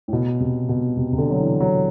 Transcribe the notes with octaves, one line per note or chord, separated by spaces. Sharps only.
A2
B2
C3
B2
C3
C3
D3
F#3
E3
F#3